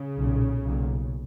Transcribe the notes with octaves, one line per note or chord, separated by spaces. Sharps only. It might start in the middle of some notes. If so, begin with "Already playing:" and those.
Already playing: C#3
B1 A#2
B1 A#2